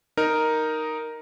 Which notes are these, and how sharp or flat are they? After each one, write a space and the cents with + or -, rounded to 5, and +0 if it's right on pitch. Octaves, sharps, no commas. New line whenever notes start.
D#4 +0 A#4 +0